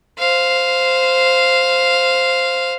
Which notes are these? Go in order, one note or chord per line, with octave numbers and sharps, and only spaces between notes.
C5 F5